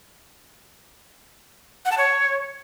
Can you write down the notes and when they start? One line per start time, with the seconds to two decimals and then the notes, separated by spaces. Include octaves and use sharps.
1.85 F#5
1.91 A5
1.98 C#5